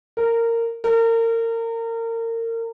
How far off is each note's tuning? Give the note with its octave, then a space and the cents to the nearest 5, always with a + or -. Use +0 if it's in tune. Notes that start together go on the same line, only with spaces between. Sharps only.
A#4 -15
A#4 -30